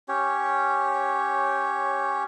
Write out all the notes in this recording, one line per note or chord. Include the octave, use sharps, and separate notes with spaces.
C#4 G4 C#5